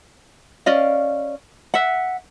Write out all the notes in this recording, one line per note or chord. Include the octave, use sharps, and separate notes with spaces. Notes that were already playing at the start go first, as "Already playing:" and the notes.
C#4 D5 D#5 F5
E5 F#5